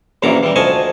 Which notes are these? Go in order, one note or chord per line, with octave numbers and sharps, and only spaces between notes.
A#1 F#2 A#2 E3 A#5 D6
E3 G3
D2 F3 D#5 G#5 A5 C#6